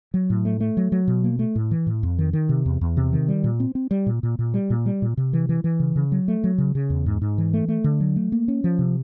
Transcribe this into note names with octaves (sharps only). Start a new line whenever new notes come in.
F#3
A2
A3
A3
F#3
F#3
B2
A#3
A3
A2
E3
A2
F2
D#3
D#3
C3
E2
E2
C3
D#3
G3
A#2
C4
C4
G3
A#2
A#2
A#2
G3
A#2
G3
A#2
C3
E3
E3
E3
C#3
C#3
F#3
A3
F#3
C#3
C#3
E2
G#2
G#2
E3
A3
A3
D3
F#3
A3
A#3
C#4
F3
C3